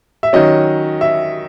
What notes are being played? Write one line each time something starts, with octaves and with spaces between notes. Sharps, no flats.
E5
D#3 F#3 C#4 D#5
E5